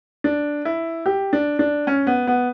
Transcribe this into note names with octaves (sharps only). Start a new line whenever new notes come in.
D4
E4
G4
D4
D4
C#4
B3
B3